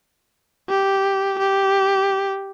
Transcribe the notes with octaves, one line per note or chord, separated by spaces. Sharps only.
G4
G4